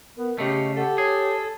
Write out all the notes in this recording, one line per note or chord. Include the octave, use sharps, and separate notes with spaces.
B3 A#4
C#3 A3 G4 D#5
G4 A4 F#5
G#4 C#5